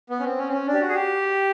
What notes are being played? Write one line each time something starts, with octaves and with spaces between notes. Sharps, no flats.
B3
C#4
C4
C#4
C4
C#4
D4
G4
F#4
G#4
G4